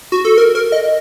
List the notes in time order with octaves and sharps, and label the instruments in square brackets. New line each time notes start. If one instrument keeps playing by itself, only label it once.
[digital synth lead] F#4
A4
A#4
A#4
D#5